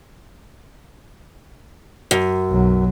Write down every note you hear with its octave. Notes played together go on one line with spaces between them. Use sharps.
F#2
B1 F#3